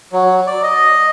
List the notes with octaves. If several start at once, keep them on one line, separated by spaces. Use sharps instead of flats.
F#3
D5
D#5